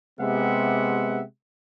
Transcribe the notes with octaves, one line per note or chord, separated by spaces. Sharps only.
C3 G#3 B3 G4 E5 F#5